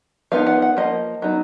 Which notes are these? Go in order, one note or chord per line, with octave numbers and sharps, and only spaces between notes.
F3 B3 D#4 F5
F#5
F#5
F3 A#3 D#5
F#3 B3 D#4